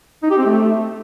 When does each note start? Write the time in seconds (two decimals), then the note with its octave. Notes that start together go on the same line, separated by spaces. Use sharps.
0.23 D#4
0.30 G4
0.38 C4
0.46 A3